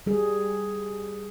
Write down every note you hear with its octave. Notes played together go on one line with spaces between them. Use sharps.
G3 G#4